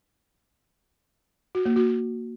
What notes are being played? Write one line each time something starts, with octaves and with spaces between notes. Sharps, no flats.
F#4
A#3
F#4